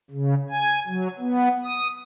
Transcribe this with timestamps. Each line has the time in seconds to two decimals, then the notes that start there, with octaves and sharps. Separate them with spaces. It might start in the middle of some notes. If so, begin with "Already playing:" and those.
0.11 C#3
0.50 G#5
0.87 F#3
1.19 B3
1.65 D#6